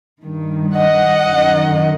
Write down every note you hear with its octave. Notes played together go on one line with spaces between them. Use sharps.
G2 D#3
D#5 F#5
F#2 D#3